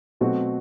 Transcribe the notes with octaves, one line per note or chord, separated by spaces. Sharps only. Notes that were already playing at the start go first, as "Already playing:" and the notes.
B2 F#3 A3 C4 F#4